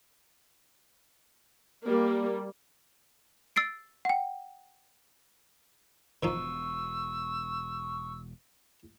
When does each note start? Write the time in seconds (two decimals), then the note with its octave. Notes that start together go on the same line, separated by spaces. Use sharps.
1.85 G3 A#3
3.56 E6 A6 C7 D7
4.05 F#5 G5
6.23 E1 B2 D#3 F3 D#4 C#6 E6